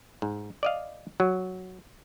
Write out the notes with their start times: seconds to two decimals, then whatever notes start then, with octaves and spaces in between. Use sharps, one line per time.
0.22 G#2
0.63 D5 D#5 F5
1.20 F#3